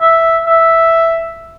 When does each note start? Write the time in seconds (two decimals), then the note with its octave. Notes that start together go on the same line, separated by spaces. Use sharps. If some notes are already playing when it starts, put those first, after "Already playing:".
0.01 E5
0.46 E5